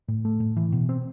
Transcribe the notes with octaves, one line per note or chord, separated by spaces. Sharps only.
A2
A3
A2
E3
B2
C4